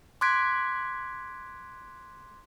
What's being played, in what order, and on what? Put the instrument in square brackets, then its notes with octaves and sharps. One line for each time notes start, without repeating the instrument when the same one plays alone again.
[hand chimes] C6 D6 F#6 G#6 B6 D7